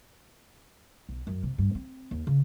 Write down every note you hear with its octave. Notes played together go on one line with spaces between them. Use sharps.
B1
F#2
C3
G2
C4
D#2
C#3